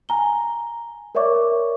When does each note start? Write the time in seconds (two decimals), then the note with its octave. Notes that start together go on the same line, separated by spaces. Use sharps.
0.09 G#5 A#5 G7
1.15 A#4 C#5 D5 E5 C#6 D6